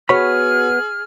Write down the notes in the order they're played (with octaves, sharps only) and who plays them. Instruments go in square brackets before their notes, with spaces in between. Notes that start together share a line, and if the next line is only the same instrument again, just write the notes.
[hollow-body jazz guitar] B3 C#5 B5 [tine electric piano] F#4 [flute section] G#4 F6